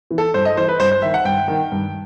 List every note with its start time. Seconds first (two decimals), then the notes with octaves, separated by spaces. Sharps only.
0.11 E3
0.18 A4
0.34 G2 C5
0.45 D#5
0.57 E3 C5
0.68 B4
0.80 G2 C5
0.92 C5
1.02 D#3 E5
1.14 F#5
1.25 G2 G5
1.48 D#3
1.72 G2